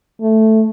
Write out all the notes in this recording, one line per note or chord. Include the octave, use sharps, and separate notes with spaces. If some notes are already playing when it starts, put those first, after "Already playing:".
A3